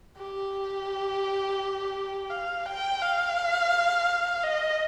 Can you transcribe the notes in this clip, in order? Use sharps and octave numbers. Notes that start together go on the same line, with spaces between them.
G4
F5
G5
F5
D#5